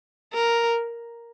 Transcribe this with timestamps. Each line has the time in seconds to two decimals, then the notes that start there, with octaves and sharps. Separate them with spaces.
0.33 A#4